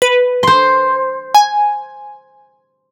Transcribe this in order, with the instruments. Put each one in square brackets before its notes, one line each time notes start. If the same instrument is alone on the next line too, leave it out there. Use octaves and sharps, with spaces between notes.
[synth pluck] B4
[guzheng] C5 C6
[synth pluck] G#5